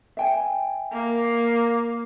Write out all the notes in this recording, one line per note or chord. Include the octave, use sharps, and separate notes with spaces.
E5 G5 G#5
A#3